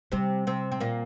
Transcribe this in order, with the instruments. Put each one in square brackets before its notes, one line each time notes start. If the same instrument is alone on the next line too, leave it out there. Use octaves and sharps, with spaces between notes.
[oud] C3 C4 [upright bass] G3
[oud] C3 C4
C4
A#2 A#3